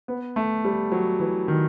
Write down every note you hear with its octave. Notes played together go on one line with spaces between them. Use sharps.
B3
A3
G3
F#3
E3
D#3